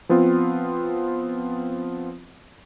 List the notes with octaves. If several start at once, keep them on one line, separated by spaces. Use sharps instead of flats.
F3 B3 C4 F4